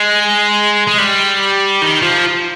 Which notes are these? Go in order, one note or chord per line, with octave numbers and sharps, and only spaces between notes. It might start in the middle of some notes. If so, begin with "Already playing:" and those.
Already playing: G#3
G#3
G3
D#3
F3